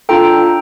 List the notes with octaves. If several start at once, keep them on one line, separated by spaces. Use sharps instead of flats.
D4 F4 A4 G5 A#5